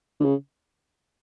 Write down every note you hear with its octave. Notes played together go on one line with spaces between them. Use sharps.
D3
C#3